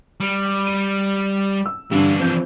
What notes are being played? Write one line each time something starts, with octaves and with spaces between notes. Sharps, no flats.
G3
D#7
E6
G2 D3 E3 D4
F3 C4 G6